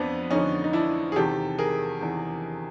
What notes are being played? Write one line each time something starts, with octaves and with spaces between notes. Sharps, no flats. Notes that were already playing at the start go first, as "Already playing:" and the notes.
Already playing: F2 B3 C4 D4
F2 D3 C#4 D#4
D#4
D4 E4
G#4
E2 C3 D#3 G4 A4
G#4 A#4
E2 C3 D#3